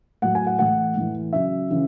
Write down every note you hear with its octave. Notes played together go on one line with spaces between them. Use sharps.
A2 F#3 F#5
G#5
F#5
A2 E3 F#5
A2 E3
C#3 F#3 E5
C#3 E3